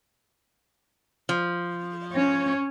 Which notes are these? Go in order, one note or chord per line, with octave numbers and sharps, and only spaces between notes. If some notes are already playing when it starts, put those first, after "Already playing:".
F3
C#4 C#5